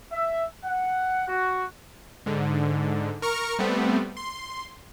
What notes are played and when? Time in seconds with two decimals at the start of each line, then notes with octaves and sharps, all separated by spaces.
0.11 E5
0.64 F#5
1.28 F#4
2.26 G#2 D3
3.22 A#4 A#5 C#6 F6
3.59 G3 A3 B3 C4
4.17 C6